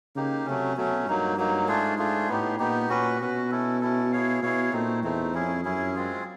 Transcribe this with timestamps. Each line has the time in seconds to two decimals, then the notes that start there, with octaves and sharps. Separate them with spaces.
0.15 C#3 A#3 D#4 G4
0.45 C3 F#3 A3 C#4
0.76 B2 F#3 A3 C#4
1.07 G2 F#3 A#3 D#4
1.37 F#3 A#3 D#4
1.68 G#2 A3 D4 F4 G#4
1.98 A3 D4 F4 G#4
2.29 A2 B3 D#4 G4
2.59 A#2 B3 D#4 G4
2.89 A#2 C#4 F#4 B4
3.20 B2 C#4 F#4 B4
3.51 C#4 E4 A4
3.81 C#4 E4 A4
4.12 E4 G#4 C#5 F5
4.42 B2 E4 G#4 C#5 F5
4.73 A#2 A3 C4 D#4
5.04 E2 A3 C4 D#4
5.34 F2 C#4 E4 G#4
5.65 F#2 C#4 E4 G#4
5.95 G#3 C4 F4 G#4